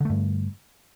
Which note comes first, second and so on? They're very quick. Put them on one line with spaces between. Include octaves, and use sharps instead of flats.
D3 A3 G2